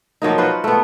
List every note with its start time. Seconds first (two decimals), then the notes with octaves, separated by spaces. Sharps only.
0.22 F3 F#3 A#3 D#4
0.38 F4 F#4 B4 C5
0.64 A3 B3